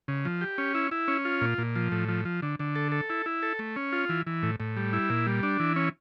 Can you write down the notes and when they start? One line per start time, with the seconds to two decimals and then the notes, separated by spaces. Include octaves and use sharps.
0.08 C#3
0.25 F3
0.41 G4
0.58 C#4
0.75 E4
0.91 E4
1.08 C#4
1.25 F4
1.41 A#2
1.58 A#2
1.76 F3
1.92 A2
2.09 F3
2.25 F3
2.42 D3
2.59 D3
2.75 A4
2.92 A4
3.10 E4
3.26 E4
3.43 A4
3.59 A3
3.76 C#4
3.93 F4
4.09 E3
4.27 E3
4.43 A2
4.60 A2
4.77 G3
4.93 E4
5.10 A#2
5.27 G3
5.43 D4
5.60 E3
5.76 C#4